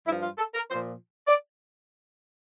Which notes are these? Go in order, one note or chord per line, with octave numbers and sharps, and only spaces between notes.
G2 F3 E4
F4
A4
A#4
F3 C5
A#2
D5